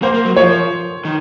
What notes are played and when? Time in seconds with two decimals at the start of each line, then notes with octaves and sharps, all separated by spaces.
0.02 A#3 C5
0.14 A#3
0.25 F#3
0.36 F3 C#5
1.05 D#3